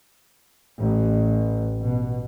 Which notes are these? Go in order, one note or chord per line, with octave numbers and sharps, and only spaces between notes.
A1
B2